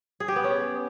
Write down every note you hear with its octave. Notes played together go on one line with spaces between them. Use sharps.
G#4
G4
B3
C#4